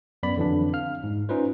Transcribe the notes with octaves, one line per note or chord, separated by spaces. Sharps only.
F#2 B3 D5 B5
F2 D3 E3 F#3 D4
F5 F6
G#2
C#4 D#4 F4 B4 C5